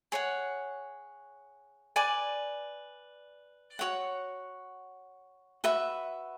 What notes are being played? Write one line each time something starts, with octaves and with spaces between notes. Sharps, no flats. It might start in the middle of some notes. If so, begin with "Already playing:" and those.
G#4 C#5 F#5
B4 D5 G#5 D6
F#4 C#5 F#5
F#4 B4 E5